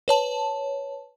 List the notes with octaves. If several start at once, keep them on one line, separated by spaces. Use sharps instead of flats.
B4 C#5 A5